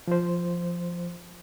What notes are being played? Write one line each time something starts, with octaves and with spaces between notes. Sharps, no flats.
F3 C5